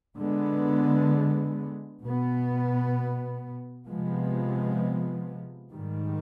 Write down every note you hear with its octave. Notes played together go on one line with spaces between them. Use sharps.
D3 G#3 B3
B2 B3
C3 F3 G#3 B3
G#2 D#3 G3